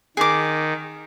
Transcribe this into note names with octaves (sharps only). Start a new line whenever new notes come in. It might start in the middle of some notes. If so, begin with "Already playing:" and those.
D#3 G#4 D6